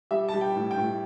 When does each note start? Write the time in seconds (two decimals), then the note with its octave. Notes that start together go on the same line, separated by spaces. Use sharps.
0.11 G3 E5
0.29 A5
0.34 G3
0.41 G5
0.56 A2
0.71 G5
0.78 A2